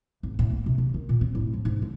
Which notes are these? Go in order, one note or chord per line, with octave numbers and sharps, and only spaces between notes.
G#1
A2
A#3
C3
D3
D#3
A#2
C4
A2
F3
G#2
D3